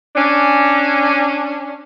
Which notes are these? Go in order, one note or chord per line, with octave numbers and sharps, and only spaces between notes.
C#4 D4